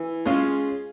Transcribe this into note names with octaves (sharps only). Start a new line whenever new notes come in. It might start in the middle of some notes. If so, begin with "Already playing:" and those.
Already playing: E3
G#3 C#4 F4 G#4